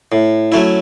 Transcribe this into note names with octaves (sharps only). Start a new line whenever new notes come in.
A2
F#3 A3 C#4 E4